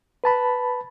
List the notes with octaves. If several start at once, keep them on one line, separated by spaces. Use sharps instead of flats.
B4 A5 B5